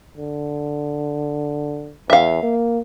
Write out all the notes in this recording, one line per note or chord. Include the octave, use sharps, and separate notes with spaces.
D3
E2 E5 F5
A#3